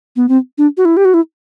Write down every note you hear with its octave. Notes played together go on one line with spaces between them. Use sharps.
B3
C4
D4
F#4
E4
G4
F#4
E4